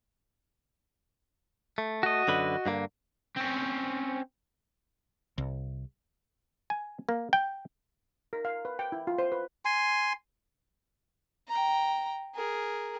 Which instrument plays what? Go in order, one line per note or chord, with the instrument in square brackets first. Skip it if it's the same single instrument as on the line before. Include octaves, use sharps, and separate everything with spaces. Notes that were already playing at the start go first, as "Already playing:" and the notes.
[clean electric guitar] A3
[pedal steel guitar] F#4 D#5
[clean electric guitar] F#2 D3 B4
G2 D3 A#3
[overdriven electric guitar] C4 C#4
[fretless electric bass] C2
[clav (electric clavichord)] G#5
A#3
G5
[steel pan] A#4
F5
B4
G5
E4
F4
C5
B4
[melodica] G#5 C6
[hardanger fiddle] G5 A#5
G#4 A#4